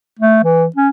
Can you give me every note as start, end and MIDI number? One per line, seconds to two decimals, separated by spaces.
0.19 0.39 57
0.44 0.66 52
0.76 0.89 61